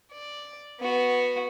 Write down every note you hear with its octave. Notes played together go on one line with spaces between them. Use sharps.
D5
B3 F#4